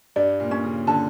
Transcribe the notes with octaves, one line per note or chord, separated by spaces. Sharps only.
G2 D5
A#2
C#4
C#3
D3 A5